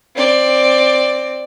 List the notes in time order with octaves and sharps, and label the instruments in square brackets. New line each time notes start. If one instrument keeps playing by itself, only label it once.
[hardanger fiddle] C4 D5